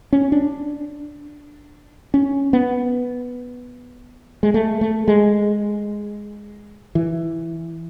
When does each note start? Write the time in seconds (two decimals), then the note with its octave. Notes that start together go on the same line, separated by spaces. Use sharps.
0.13 C#4
0.32 D4
2.14 C#4
2.53 B3
4.43 G#3
4.54 A3
4.81 A3
5.08 G#3
6.95 E3